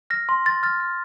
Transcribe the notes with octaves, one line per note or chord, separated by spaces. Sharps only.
F6 A#6
C6
C6 A6
F6 A6
F6